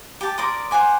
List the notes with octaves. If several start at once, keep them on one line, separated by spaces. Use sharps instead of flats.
G4 A5
A#4 D5 C6 D#6
C5 F#5 G#5 D6